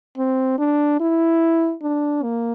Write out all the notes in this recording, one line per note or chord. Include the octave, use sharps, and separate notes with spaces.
C4
D4
E4
D4
A#3